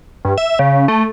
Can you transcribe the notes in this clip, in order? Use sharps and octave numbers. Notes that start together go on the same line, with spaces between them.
G2
E5
C#3
A3